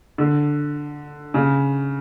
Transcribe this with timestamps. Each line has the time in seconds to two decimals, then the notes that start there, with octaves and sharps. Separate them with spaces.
0.18 D3
1.34 C#3